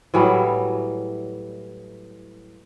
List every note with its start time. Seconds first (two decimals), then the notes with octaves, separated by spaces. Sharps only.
0.14 A2 E3 F#3 G3